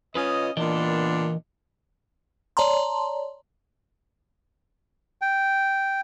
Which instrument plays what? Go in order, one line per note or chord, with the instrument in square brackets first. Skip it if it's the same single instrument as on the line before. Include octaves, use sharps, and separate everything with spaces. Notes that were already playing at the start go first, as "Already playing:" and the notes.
[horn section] C#4 D#5 [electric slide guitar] F4 B4
[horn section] A#2 B3 D4 [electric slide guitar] E3 A#4 D#5
[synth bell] C#5 D5 A5 A#5 C6
[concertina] G5